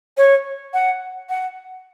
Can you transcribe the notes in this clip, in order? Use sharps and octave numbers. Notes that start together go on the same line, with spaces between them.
C#5
F#5
F#5